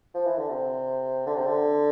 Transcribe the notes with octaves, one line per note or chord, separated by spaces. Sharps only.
F3
E3
D3
C3
D3
C3
D3